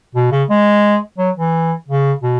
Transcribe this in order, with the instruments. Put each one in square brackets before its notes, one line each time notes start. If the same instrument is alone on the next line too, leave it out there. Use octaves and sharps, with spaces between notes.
[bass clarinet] B2
C#3
G#3
F#3
E3
C#3
B2